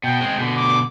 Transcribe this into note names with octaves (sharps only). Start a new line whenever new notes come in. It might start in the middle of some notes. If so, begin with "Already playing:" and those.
B2 G5
G#3 C4
B2 D3
D6